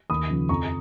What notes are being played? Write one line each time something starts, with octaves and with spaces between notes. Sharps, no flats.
D#2 B5 D#6
C#3 F3
F2 A#5 C#6